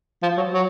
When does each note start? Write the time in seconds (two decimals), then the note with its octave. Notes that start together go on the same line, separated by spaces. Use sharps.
0.23 F3
0.37 F#3
0.53 F#3